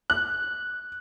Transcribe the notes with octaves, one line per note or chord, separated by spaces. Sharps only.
F#6